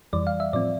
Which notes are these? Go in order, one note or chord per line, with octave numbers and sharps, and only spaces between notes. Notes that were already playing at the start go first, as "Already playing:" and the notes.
F2 E3 G3 D5
F5
E5
A2 F3 C4 D5